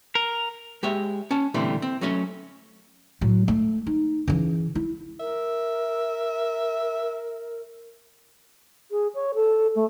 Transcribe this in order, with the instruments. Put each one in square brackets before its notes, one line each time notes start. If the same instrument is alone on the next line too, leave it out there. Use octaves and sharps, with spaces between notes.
[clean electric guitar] A#4
[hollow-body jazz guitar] G#3 G4 C#5 E5
C#4 A5
A#2 D3 E3 G3 A3 C4
C4
F#3 A3 C#4 C#5
[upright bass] A2 F#3
A3
D#4
C#3 E3
E4
[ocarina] A#4 [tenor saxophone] E5
[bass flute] G#4
C#5
A4
A3